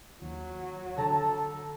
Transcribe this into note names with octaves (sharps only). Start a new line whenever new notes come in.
D#2 F#3
D3 A4 A5 A#5